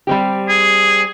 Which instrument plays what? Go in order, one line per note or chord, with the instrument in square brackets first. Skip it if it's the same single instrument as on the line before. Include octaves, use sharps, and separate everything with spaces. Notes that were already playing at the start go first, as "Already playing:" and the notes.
[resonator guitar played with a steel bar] G3 C4 G4
[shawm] G#4